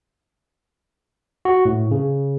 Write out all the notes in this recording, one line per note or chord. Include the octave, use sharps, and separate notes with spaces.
F#4
A2
C#3